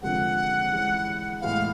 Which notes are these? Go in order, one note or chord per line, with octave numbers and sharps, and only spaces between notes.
D3 F3 G#3 C4 F#5
E3 G#3 C#4
A2 E3 G#3 B3 F5